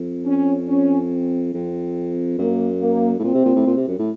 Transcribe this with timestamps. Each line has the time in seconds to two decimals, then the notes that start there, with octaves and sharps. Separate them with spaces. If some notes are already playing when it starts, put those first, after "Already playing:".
Already playing: F2
0.25 C#4
0.68 C#4
1.11 C4
1.53 F2 C4
2.38 F#2 A#3
2.81 A#3
3.19 A2
3.24 A#2 C4
3.34 C3
3.45 A#2
3.55 A2
3.67 A#2
3.77 C3
3.87 F#2
3.99 A2